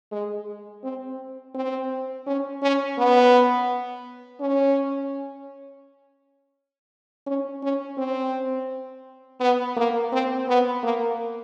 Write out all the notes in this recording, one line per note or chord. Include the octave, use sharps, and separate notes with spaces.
G#3
C4
C4
C#4
C#4
B3
C#4
C#4
C#4
C4
B3
A#3
C4
B3
A#3